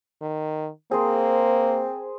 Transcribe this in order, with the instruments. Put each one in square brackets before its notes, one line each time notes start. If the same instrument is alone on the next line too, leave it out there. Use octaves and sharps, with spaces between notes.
[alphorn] D#3
[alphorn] A#3 [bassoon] C4 [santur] G#4 A#4 C5